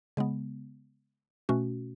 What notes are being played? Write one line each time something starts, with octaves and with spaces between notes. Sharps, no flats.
C#3 G#3 B3
B2 A3 C#4 F#4